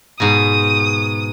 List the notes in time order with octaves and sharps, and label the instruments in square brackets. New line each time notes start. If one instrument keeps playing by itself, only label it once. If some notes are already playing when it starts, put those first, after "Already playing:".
[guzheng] G#2 B2 [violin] D#6